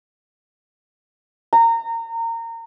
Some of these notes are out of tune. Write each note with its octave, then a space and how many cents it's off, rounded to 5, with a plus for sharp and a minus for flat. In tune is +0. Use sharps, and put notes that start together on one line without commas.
A#5 -25